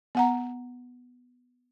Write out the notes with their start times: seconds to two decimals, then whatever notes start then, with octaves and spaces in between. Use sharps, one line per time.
0.15 B3 F#5 A#5